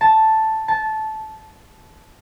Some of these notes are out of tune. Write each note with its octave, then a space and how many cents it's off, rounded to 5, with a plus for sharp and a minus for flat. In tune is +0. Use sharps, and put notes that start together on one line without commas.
A5 +0
A5 -15